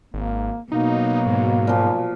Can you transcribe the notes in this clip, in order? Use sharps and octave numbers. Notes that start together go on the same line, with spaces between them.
G#1 A#3
B2 F#3 A#3 D#4
G#2
A#2 F3